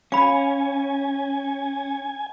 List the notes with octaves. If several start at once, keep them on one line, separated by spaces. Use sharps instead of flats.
C#4 F5 G#5 B5